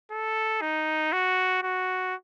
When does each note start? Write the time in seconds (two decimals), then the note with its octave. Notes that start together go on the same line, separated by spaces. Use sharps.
0.11 A4
0.61 D#4
1.13 F#4
1.63 F#4